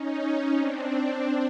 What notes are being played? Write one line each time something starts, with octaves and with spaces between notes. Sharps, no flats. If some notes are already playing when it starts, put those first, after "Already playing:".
Already playing: C#4 D#4
C4 D4